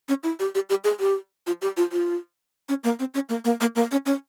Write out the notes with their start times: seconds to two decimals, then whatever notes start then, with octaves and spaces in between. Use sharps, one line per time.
0.09 C#4
0.23 E4
0.40 G4
0.55 G4
0.70 G4
0.84 G#4
1.00 G4
1.47 F4
1.62 G4
1.77 F4
1.92 F4
2.69 C#4
2.84 A#3
2.99 C4
3.14 C#4
3.29 A#3
3.45 A#3
3.61 A#3
3.76 A#3
3.91 C#4
4.06 C#4